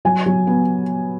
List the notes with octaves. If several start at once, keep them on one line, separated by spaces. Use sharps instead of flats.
F#3 G#5
F#3
B3